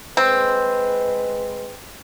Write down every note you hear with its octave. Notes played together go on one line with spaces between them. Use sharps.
G#3 C4 B4